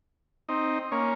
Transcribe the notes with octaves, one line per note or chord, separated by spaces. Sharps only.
C4 D#4
A#3 C#4